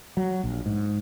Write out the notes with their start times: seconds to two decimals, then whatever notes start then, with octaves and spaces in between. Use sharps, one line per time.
0.17 F#3
0.43 A#1
0.66 G#2